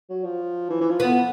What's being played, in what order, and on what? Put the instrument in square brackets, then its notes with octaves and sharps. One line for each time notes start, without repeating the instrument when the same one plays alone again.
[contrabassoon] F#3
F3
E3
E3
F3
[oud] B3